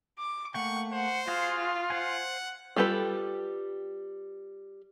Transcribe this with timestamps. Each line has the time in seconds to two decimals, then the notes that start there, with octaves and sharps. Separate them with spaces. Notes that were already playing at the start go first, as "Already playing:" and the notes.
0.19 D6
0.54 A3 A#3 F#5 G5 C#6
0.93 C5 F#5
1.28 F4 F#4 G#4 F5
1.90 C5 F#5 G#5
2.76 G3 F4 G4 A4 B4